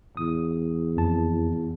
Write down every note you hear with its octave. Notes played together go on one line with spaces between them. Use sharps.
E2 D#6
F2 A5